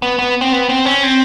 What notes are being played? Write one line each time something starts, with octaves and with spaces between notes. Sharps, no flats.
B3
B3
C4
B3
C4
C#4
C4